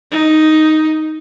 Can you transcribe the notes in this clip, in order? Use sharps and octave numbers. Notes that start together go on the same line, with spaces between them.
D#4